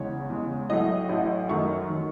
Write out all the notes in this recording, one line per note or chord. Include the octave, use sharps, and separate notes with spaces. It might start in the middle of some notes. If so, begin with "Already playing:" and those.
Already playing: E2 C#3 G#3 C#5
E2 C#3 G#3
A1 A2 F#3 A3 D#5
A1 A2 F#3 A3
F#2 D#3 F#3 A3 C#6
D#3 F#3 A3